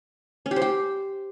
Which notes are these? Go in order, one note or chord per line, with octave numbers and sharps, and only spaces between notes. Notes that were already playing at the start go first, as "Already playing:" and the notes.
C#4
G4
C5
G4